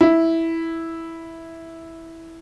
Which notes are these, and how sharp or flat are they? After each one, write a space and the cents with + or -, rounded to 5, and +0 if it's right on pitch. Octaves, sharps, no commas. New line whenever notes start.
E4 -5